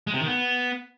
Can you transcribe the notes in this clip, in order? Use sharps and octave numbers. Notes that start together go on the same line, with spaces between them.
G#3
C3
D#3
B3